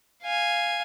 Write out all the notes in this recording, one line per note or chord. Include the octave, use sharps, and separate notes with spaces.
F5 G#5